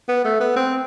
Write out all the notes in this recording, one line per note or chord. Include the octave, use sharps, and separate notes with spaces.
B3
A3
B3
C4